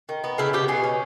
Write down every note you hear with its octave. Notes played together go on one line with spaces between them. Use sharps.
D#3
B3
C#3 E4
B3 G4
B2 G#4
C#4